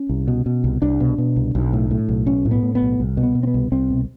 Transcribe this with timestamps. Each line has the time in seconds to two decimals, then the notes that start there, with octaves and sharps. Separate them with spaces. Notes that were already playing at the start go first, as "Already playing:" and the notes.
Already playing: C#4
0.09 C2
0.28 B2
0.46 B2
0.64 C2
0.82 C2 D4
1.00 B2
1.18 B2
1.36 C2
1.55 B1
1.73 A2
1.91 A2
2.09 B1
2.27 B1 C#4
2.45 A2
2.51 B3
2.63 A2
2.75 B3
2.81 B1
3.00 C2
3.17 B2
3.23 B3
3.35 B2
3.43 C4
3.47 B3
3.54 C2
3.72 C2 C4
3.90 B2